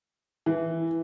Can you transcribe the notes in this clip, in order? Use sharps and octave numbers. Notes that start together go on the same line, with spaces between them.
E3